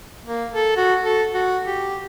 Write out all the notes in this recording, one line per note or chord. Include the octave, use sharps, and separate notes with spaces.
A#3
A4
F#4
A4
F#4
G4